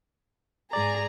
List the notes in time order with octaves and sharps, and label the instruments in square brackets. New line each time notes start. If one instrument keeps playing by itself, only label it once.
[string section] G#2 G#4 A#5 [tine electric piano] D5